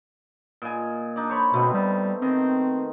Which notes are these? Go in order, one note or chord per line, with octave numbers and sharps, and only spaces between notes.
A#2 D#5 G#5
D4 D#4 D5
C5 C#5 B5
B2 A3 B3 C4
G3
D#3 C4 D#5